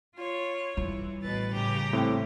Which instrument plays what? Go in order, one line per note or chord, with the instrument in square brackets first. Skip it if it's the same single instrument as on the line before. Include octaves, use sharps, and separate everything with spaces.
[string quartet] F4 C#5
[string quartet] E3 [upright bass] G3
[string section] A1 [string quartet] B2 B4 A6
[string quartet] C#3 G4 A#5
[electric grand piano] A2 C4